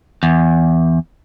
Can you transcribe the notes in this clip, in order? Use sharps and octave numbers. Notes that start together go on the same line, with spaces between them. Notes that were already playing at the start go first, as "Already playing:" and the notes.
E2